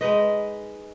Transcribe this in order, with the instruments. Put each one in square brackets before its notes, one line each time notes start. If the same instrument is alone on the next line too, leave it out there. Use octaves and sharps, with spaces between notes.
[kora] G#3 D#4 B4 D#5